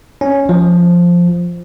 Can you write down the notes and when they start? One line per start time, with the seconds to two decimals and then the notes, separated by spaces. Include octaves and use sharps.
0.21 C#4
0.49 F3